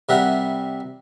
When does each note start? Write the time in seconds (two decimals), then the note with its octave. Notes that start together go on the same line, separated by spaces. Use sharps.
0.09 C3 G3 A#4 E5 F#5